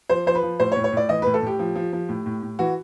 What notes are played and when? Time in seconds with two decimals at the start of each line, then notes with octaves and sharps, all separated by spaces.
0.09 F3 C5
0.26 F3 C5
0.35 B4
0.43 F3
0.59 A2 C5
0.72 C#5
0.76 A2
0.84 C#5
0.93 A2 D5
1.09 E3 D#5
1.22 A2 B4
1.34 A4
1.42 A2 G4
1.59 F3
1.75 F3
1.93 F3
2.09 A2
2.26 A2
2.42 A2
2.59 E3 F#4